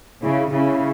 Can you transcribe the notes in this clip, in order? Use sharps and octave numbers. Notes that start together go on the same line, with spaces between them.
C#3 E4
C#3 E4